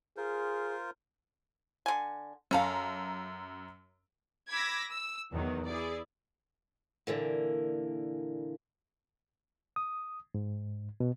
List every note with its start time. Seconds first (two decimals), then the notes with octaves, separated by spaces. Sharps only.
0.17 F4 G#4 A#4 C5
1.86 D3 G#5
2.51 F#2 C#4 A4 F5 A#5
4.51 B5 D6 E6 G#6 A#6 B6
4.89 E6
5.31 E2 D#3 F#3
5.67 E4 G#4 D5
7.07 A#2 D3 E3 A#3
9.76 D#6
10.35 G#2
11.00 B2